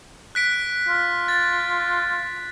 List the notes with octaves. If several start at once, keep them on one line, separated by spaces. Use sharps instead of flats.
F#6 B6 D7
F4
A6